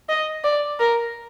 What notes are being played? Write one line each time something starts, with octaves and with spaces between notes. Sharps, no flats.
D#5
D5
A#4